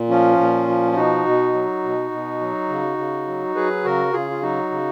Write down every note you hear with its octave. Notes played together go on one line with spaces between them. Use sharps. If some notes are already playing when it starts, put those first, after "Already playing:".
Already playing: A#2
F3 C#4 F4
A#2
F3
F4
B2 D#4 F#4
B2
F#3
B2
B2
F#3
C#3
C#3
F#3
F#3 G#4 B4
C#3 F#4 A#4
C#3 F4 G#4
F4
F#3 D#4 F#4
C#3